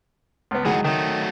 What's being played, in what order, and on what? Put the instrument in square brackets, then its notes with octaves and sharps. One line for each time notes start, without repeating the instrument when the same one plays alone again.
[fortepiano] C#2 B3
[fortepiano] D#3 F#3 G#4 [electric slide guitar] G#3 E4 F#5
[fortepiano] D#3 [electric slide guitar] F#3 A3